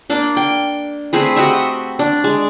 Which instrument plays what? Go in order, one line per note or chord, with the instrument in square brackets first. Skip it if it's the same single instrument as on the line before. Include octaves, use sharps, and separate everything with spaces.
[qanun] A#3 D4
G5
A3 C4 G#4 B4
F#4 G4 D#5 E5
D4
G#3